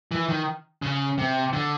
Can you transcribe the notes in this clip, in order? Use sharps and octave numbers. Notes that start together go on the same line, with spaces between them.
E3
D#3
C#3
C3
D3